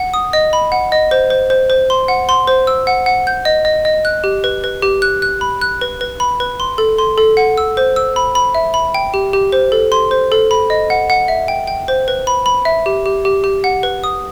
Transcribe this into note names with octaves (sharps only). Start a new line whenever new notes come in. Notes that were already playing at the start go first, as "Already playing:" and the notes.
Already playing: F#5
D#6
D#5
B5
F#5
D#5
C5
C5
C5
C5
C6
F#5
C6
C5
E6
F#5
F#5
G6
D#5
D#5
D#5
F#6
G4
B4
B4
G4
F#6
F#6
B5
F#6
B4
B4
B5
B4
C6
A4
C6
A4
F#5
E6
C5
E6
B5
B5
E5
B5
G5
G4
G4
C5
A4
C6
C5
A4
B5
D#5
F#5
F#5
E5
G5
G5
C5
B4
B5
B5
E5
G4
G4
G4
G4
F#5
B4
D#6